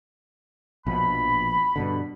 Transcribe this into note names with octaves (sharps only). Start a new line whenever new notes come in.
A#1 B2 F3 B5
G2 B2 D3